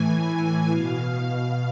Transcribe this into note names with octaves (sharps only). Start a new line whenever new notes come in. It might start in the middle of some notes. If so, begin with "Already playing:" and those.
Already playing: A2 E3 G#5
B2 F5